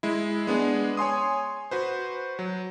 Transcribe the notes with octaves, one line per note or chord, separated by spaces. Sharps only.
G#3 E4
G#3 B3 D4 G#4
C#5 G#5 C6 D#6
F#4 B4 C5
F#3